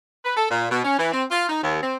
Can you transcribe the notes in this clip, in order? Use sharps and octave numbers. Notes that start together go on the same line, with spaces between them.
B4
A4
A#2
B2
C#4
E3
C4
F4
D#4
D#2
C4